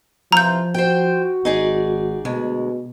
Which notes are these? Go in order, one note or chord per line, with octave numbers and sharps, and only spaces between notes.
C3 E3 F3 F4 A#5 G6
F#4 C5 G5
G#1 D#4 G#4 D5
D2 B2 G#3